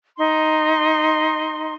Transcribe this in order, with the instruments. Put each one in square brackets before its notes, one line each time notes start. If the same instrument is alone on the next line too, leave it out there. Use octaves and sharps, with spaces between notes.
[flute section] D#4 C6